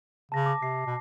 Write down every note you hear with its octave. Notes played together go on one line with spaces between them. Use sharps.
C#3 A5 A#6
D6
C3 C7
B2